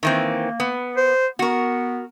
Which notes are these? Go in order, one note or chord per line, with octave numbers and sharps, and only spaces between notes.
D#3 E3 A#3 C4
B3
C5
B3 F#4 A#4